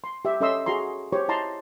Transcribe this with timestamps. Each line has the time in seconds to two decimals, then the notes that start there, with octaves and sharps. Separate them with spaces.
0.04 C6
0.25 G4 E5
0.41 C#4 A4 D#5 E5 C6 E6
0.66 F#4 G#4 A#5 C6
1.13 G4 C5 C#5 C#6
1.28 E4 D#5 A5 A#5 C6